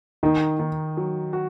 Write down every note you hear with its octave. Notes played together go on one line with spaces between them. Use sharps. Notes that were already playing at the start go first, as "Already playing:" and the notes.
D#3 D#4
D#3
F#3
F#4